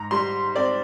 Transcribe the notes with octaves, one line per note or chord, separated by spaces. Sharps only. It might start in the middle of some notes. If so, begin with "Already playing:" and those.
Already playing: G#2 A#5
G3 C6
C4 D5